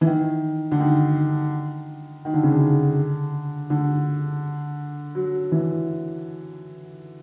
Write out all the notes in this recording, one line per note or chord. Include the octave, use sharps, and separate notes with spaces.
E3
D#3
D3
D#3
D#3
D3
C#3
D3
D3
F#3
E3